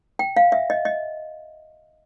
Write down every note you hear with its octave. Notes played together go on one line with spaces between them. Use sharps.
G5
F5
E5
D#5
D#5